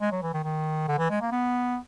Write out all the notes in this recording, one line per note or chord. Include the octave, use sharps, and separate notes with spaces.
G#3
F#3
E3
D#3
D#3
D3
E3
G#3
A#3
B3